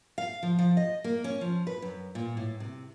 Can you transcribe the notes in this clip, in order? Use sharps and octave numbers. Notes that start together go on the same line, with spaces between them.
F5
F3
F3
D#5
A#3
C#4
F3
B4
F#2
A#2
A2
C3